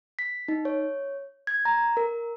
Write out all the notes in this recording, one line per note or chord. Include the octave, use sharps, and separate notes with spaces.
B6
D#4
C#5
G#6
A#5
A#4